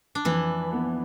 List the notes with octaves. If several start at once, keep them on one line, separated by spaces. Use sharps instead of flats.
D4
F2 E3 E4
B3